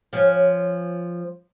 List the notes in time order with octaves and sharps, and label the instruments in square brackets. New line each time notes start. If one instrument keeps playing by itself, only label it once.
[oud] F3 C#4